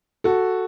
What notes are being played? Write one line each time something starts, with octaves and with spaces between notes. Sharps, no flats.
F#4 A4